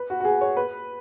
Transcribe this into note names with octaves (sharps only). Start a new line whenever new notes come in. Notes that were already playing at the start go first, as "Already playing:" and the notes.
Already playing: B4
F#4
F#4
G#4
C#5
B4